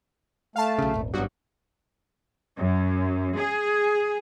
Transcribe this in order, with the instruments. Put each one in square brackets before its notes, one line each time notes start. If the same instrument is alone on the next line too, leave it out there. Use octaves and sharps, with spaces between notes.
[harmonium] A3 [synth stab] F5 A5
[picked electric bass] B1 C#3
D#1 G#1
[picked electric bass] G#1 G2 [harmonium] F#3 B3 [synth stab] F#4
[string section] F#2
G#4